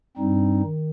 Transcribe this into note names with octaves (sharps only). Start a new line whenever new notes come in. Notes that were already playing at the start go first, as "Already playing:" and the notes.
G2 G3 C4 D#4
D#3